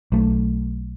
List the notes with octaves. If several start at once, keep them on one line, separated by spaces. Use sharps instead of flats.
B1 A3